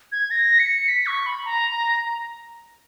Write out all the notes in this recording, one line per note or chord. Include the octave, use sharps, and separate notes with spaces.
G#6
A#6
C#7
B6
C#6
B5
A#5